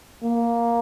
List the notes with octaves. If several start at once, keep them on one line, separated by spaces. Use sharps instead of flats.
A#3